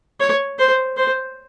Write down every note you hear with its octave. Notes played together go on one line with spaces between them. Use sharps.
C#5
C5
C5